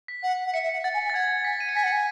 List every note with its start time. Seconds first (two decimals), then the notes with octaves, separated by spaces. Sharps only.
0.08 B6
0.23 F#5
0.46 F#5
0.54 E5 C#7
0.64 E5
0.69 F#5 C#7
0.84 F#5 A6
0.94 G#5
1.04 G#5
1.10 A6
1.14 F#5 G#6
1.44 G#5 B6
1.60 D#7
1.69 C#7
1.75 G#5 B6
1.84 F#5 C#7
1.92 G#5